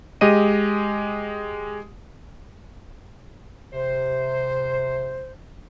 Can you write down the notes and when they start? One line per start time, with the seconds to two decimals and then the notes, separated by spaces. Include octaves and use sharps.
0.21 G#3 G4 D#5 D#7
3.72 C3 C5